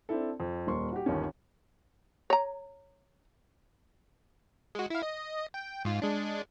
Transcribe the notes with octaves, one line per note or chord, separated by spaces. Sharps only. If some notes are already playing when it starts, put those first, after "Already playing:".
C4 D4 E4 A4
F2
D#1 A#3 C6 C#6
F#4 G4
G1 D#2 D#3 C#4
C#5 A#5
G#3 F#4
E4 F5
D#5
G5
G#2 F4
G#3 D4